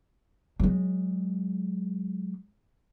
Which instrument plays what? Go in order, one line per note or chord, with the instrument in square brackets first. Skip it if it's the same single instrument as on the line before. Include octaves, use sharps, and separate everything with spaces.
[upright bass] F#3 G#3